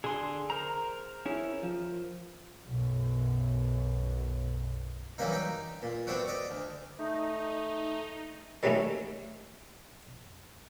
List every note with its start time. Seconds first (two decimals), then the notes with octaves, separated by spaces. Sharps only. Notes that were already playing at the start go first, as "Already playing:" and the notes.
0.04 D3 G#4 C6
0.50 A#4 C5 A#5
1.26 C#4 E4 G#4
1.63 F3
2.67 B1 F#2
5.18 E3 F#3 G3 A#3 D#4
5.33 D#4 G5
5.82 A#2
6.07 A3 B3 C4 D4 F#4
6.27 D5 D#5
6.51 D2
6.98 A3 D#4
8.63 D#3 F#3 G3 A3 A#3 C#4